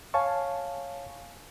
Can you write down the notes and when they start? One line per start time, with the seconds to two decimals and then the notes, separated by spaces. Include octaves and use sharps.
0.14 C#5 F5 G#5 A5 C#6